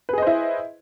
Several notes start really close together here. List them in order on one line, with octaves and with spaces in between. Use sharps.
B4 G#4 D#5 C5 E4